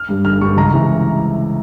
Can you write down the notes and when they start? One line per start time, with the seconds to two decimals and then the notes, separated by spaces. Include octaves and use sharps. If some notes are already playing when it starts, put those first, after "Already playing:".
Already playing: F6
0.09 G2 G3
0.25 G1 F6
0.41 G2 G3 C#6
0.57 C#2 A#5
0.74 C3 E3